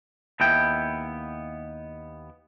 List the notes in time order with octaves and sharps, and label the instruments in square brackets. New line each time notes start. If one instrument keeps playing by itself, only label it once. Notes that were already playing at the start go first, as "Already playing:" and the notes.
[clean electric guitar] D#2 B3 E4 G5